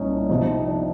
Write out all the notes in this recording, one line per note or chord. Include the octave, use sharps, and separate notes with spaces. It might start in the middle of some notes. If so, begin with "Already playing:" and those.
Already playing: C2 A#2 C#4 D#4
D4
F2 C3 F3 D#4
D4